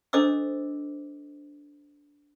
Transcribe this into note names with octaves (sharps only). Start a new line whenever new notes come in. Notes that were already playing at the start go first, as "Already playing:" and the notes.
D4 A4 C5 D#5 D6 E6